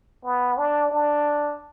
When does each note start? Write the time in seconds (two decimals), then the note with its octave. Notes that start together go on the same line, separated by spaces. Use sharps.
0.24 B3
0.58 D4
0.91 D4